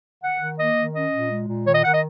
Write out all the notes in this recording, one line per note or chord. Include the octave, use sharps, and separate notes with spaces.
D#3 F#5
D#3
A#3 D#5
D#3
C#4 D#5
A#2
G#3
A#2
D#3 C#5
D#5
D#3 F#5
D#5